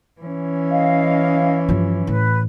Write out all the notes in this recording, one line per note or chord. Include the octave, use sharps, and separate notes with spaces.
E3 C#4
D#5 F5
G2 F3
A2 E3 B4